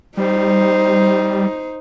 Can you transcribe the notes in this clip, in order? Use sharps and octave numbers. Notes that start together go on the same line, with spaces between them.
G3 D#4 C5